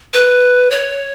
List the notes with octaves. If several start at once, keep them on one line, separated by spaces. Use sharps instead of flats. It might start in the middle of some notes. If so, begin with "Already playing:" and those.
B4
C#5